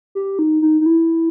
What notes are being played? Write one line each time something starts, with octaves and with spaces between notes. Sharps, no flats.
G4
D#4
D#4
D#4
E4